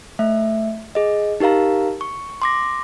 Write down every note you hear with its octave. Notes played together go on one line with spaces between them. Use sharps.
A3 E5
G#4 D#5
D#4 G4 A#4 F5 A#5
C#6
C6 D6 A#6